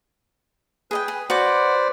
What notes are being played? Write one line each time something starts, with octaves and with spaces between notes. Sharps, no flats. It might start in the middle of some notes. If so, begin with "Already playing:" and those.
G#4 B4 D#5 G5
G#4
F#4 B4 C5 D5 D6